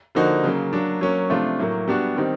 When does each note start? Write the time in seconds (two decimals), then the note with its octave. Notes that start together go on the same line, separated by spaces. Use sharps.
0.15 D3 F3 A#3 D#4 F#4
0.44 C#3 F#3 A#3
0.73 F#3 A#3 D4
1.01 F#3 A#3 C#4
1.30 C3 F3 A3 D4 F4
1.59 A2 F#3 A#3
1.88 G3 B3 D4 F#4
2.16 D#3 G3 C4 D#4